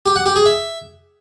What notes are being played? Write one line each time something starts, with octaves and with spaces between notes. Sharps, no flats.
G4
F#5
G4
G#4
E5